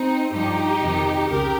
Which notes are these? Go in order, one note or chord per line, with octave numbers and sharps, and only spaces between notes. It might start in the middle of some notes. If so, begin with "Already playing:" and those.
Already playing: C4 D#4
G2 F3 D#4 G4
F2 C3 D#3
C#2 C#3 G4 A#4